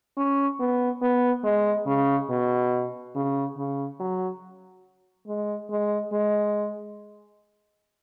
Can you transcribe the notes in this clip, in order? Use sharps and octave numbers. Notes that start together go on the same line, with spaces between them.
C#4
B3
B3
G#3
C#3
B2
C#3
C#3
F#3
G#3
G#3
G#3